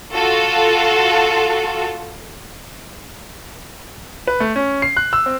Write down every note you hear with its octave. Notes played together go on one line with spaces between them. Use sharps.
F4 F#4 A4
B4
A3
C#4
C7
F#6
E6
C4